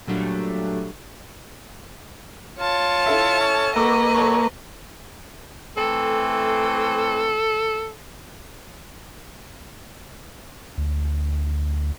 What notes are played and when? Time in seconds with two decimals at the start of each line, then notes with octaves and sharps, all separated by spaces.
0.07 A#2 F#3 G3 A3 D4
2.60 F4 C#5 A5
3.06 E4 A4 E5
3.40 C#4
3.76 A#3 F#4 A4 B4 D#5 D6 E6
4.14 F#3 A4 A5 C#6
5.77 E3 A3 C4 A4
10.77 D2